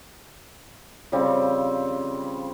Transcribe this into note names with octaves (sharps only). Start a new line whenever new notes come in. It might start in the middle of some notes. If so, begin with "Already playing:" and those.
C#3 F3 G3 C4